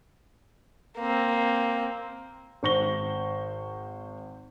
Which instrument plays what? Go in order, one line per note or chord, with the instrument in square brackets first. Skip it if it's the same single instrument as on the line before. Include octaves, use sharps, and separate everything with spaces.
[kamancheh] A#3 C4
[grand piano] G#1 C5 C#6 A#6 G7